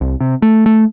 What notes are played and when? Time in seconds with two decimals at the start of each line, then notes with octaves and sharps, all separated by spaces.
0.01 C2
0.21 C3
0.42 A3
0.66 A3